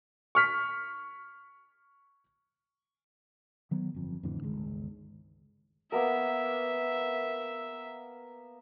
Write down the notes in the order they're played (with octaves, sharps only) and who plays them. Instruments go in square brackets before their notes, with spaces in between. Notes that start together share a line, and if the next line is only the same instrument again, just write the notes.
[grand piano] C#6 F6 B6
[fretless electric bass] D#3 F#3 B3
G1 F2
F2 A2 D3 E3
G1 C#2 D#3 G#3
[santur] A#3 B3 A#4 [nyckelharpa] E5